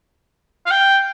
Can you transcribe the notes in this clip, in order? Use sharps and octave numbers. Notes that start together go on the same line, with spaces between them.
F5
G5